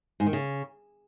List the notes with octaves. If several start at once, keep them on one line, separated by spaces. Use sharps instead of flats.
G#2
D#3
C#3